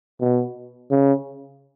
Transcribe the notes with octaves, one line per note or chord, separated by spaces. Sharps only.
B2
C#3